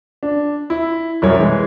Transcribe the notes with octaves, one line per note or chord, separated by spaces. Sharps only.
D4
E4
C2 F#2 A#4 C#5
E3 G#3